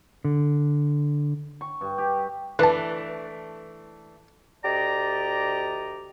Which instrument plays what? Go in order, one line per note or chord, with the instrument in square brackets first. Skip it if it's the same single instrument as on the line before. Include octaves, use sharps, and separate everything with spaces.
[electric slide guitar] D3
[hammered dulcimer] C#6
G2
G4
[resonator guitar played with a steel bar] E3 A3 D4 [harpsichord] B4 A5
[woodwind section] D2 G4 D5 D#5 A#5